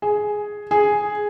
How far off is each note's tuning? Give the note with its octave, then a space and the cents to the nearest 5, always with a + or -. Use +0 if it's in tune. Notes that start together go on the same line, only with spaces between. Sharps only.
G#4 +5
G#4 +0